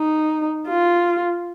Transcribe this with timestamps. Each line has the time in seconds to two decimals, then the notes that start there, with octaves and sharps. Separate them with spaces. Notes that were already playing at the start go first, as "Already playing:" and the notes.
Already playing: D#4
0.68 F4